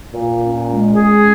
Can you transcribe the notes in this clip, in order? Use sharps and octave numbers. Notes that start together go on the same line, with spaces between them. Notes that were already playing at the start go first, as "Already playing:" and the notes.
A#2
C#4
G#3
G#4